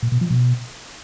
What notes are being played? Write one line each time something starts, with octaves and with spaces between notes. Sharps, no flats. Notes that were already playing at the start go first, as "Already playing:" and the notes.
A#2
B2
F3
B2